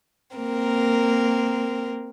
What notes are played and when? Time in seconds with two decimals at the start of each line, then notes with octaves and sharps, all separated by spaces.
0.36 A#3 C4 A#4